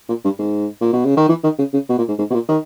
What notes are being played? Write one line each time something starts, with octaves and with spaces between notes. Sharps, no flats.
A#2
G2
G#2
A#2
B2
C#3
D#3
E3
D#3
C#3
C#3
B2
A#2
G#2
G#2
B2
A#2
D#3